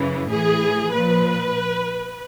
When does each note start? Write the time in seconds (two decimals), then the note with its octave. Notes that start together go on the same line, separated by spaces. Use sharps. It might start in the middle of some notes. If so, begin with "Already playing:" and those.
Already playing: F#2 C#3 E3
0.29 A2 E3 G#4
0.91 A#2 F3 B4